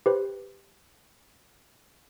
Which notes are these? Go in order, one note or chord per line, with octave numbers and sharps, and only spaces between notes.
G4 B4 C5